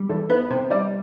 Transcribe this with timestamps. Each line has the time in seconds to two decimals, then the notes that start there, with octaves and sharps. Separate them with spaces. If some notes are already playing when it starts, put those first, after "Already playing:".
Already playing: G3
0.09 E2 A4
0.30 B3 B4
0.50 C3 C5
0.70 G3 D5